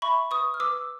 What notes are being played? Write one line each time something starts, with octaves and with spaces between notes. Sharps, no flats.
E5 B5 C#6
B4 C#6 D#6
F6
B4 D6 E6